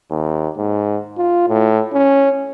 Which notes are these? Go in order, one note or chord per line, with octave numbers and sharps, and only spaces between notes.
D#2
G#2
F4
A2
C#4